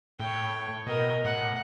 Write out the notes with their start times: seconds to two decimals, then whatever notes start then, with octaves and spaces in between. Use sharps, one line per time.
0.20 A2 C#5 G5
0.87 B2 A#4 D#5
1.25 A2 F#5